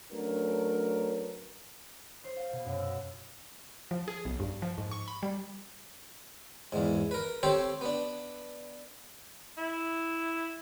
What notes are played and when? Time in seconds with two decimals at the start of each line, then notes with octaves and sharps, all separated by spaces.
0.12 F#3 A3 C#4 D4 A#4 B4
2.24 C5
2.37 F5
2.52 B2
2.65 F#2
2.80 E6
3.91 F3
4.08 G#4
4.25 B1
4.40 G2
4.62 F3
4.78 G#2
4.91 C#6
5.08 B5
5.23 G3
6.72 E2 G#2
7.11 A#4 B4
7.43 C4 G4 A4 C5 C#5
7.81 B3 D4
9.58 E4